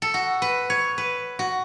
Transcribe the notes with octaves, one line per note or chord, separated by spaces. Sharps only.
A4
F#4
B4
C#5
B4
F#4